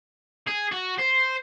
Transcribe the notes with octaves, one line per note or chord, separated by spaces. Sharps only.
G#4
F#4
C5